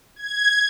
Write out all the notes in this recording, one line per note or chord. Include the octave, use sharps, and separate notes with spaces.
G#6